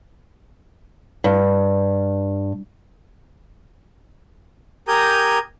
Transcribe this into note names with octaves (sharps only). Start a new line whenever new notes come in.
G2
G4 A#4 G#5 A#5 D#6 G6